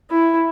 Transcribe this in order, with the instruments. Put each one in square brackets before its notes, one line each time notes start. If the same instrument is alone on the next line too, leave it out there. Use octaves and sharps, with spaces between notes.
[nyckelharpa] E4